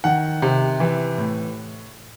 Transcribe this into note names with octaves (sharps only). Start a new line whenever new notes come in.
D#3 F#5
C3
E3
A2